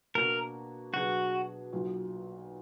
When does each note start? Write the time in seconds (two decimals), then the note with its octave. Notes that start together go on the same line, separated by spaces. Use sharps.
0.15 B2 A#3 D4 F#4 A#4
0.94 B2 F#3 D4 F#4 G#4 B4
1.73 B1 A#2 F#3